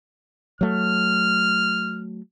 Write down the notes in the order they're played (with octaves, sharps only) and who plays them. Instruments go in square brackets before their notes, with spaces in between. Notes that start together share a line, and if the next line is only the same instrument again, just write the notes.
[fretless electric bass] F#3 A3 [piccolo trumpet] F6